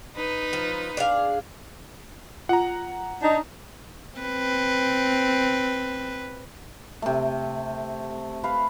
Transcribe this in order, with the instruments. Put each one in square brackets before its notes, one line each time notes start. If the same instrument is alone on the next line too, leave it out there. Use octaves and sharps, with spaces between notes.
[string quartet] D#4 B4
[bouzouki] F3
D4 G#4 F5
[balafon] F4 [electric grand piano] F#5 A#5
[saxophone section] D4 D#4
[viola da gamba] C4 B4
[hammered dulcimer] C3 A3
B4 F5